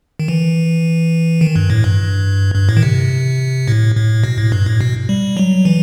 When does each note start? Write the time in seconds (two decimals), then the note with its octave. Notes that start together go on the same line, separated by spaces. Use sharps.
0.20 D#3
0.28 E3
1.41 D#3
1.56 G2
1.70 A2
1.84 G2
2.55 G2
2.69 A2
2.77 D#3
2.82 C3
3.68 A2
3.96 A2
4.24 B2
4.38 A2
4.52 G2
4.66 A2
4.81 B2
5.09 G3
5.37 F#3
5.65 E3